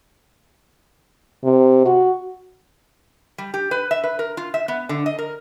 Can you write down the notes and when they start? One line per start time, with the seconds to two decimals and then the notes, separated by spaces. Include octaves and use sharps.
1.44 C3
1.85 F#4
3.38 G3
3.54 G4
3.71 B4
3.91 E5
4.04 B4
4.19 A#4
4.37 F4
4.54 E5
4.68 B3
4.89 D3
5.06 D#5
5.19 A#4